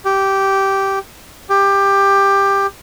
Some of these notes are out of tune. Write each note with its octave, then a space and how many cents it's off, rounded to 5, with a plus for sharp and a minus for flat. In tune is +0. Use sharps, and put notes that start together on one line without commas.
G4 -10
G4 +15